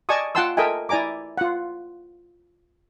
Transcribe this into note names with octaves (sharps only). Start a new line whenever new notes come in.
D5 D#5 G#5 A5 C#6 D#6
F4 F#5 G5 A5 C6 E6
A4 A#4 D#5 E5 G5 G#5
E4 D5 G#5 A#5 D6
F4 F#5